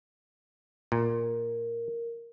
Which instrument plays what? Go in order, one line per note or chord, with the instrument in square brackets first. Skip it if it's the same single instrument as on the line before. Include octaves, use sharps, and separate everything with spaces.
[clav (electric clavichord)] A#2 [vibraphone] A#4